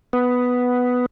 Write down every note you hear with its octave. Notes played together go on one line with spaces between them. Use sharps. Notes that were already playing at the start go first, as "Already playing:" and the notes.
B3